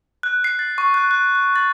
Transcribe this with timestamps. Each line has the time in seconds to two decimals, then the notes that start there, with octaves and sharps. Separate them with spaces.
0.23 F#6
0.44 C7
0.59 A6
0.78 C#6
0.94 F#6
1.11 F#6
1.35 F#6
1.56 A6